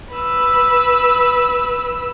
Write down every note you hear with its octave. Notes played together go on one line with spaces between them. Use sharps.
B4 E6